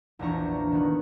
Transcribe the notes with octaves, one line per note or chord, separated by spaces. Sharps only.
A#1 E2 D4 A#5 C#6
D#3 B3